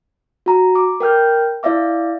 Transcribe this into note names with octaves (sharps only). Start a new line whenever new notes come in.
F#4 A#5
D6
A#4 G5 F6 G6
E4 D5 E5 F5 D6